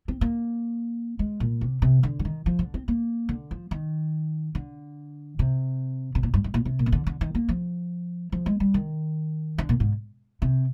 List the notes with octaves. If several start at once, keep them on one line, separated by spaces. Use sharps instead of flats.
C4
A#3
G#3
A#2
C3
C3
D3
F3
D#3
F3
D3
C4
A#3
D3
F3
D#3
D3
C3
C3
A#2
G2
G2
A#2
C3
A#2
C3
D3
D3
D#3
A#3
F3
F3
G#3
G3
D#3
D3
A#2
G#2
C3